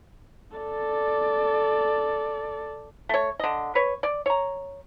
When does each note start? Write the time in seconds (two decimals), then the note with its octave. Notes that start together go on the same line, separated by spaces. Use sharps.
0.58 A4 D5
3.09 A3 C#5
3.39 D3 D#5
3.75 B4 C#5
4.03 D5
4.26 C#5 A#5